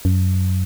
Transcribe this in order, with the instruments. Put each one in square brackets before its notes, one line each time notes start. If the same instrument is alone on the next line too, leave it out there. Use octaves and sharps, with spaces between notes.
[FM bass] F#2